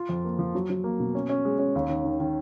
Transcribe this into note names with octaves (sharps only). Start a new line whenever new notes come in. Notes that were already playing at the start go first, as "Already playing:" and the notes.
Already playing: F4
F2
A#3
F3
F#3
F#3
A#3
B2
C#4
C#4
G#3
C#4
D#2
D#3
D#3
D#3